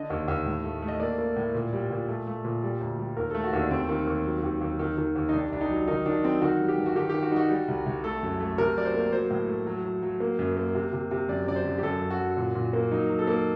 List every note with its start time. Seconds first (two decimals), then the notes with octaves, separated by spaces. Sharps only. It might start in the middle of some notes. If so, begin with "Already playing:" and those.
Already playing: D3 D#5
0.10 D#2
0.28 D#2
0.46 A2
0.64 A3
0.82 A3
0.88 D#5
1.00 A#3 D5
1.18 A#3
1.36 A2
1.55 A#2
1.73 G3
1.90 A#2
2.09 A3
2.27 A3
2.45 A#2
2.62 G3
2.81 D2
2.99 G3
3.17 D#2 A#4
3.31 A3 A4
3.44 F#4
3.53 D#2 D4
3.71 D#2 C4
3.89 D#3
4.07 D#2
4.25 F#3
4.43 D#2
4.61 D#2
4.79 D#3
4.98 D#3
5.15 D#2
5.29 D#4
5.33 C2 D4
5.52 C2 D4
5.61 D#4
5.69 F#3
5.88 D#3 D#4
6.06 D#3 D4
6.24 F#3 C4
6.42 D#3 F#4
6.59 G3
6.68 G4
6.78 G2
6.86 F#4
6.96 D#3 G4
7.10 G4
7.14 D#3
7.23 F#4
7.31 G3 D#4
7.36 F#4
7.50 G3
7.68 C2
7.86 C2
8.04 A3 A4
8.23 F#2
8.40 A3
8.58 C3 A#4
8.76 F#3 D5
8.85 C5
8.94 A#3
9.12 F#3 C5
9.30 A2
9.48 A3
9.67 F#3
9.85 F#3
10.02 F#3
10.20 A#3
10.39 F#2
10.57 A#3
10.75 C3
10.93 C3
11.11 C3
11.29 F#2 D5
11.47 F#2 D5
11.56 C5
11.65 F#2
11.78 G4
11.83 F#2 A4
12.01 F#2
12.10 F#4
12.19 F#3
12.37 A#2
12.55 A#2
12.73 A#3
12.91 F#3 D#4
13.10 F#3
13.19 A4
13.27 A#3